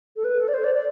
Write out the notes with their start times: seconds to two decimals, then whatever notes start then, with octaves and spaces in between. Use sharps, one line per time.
0.16 A4
0.24 B4
0.39 A4
0.48 D5
0.54 C5
0.64 D5
0.75 D5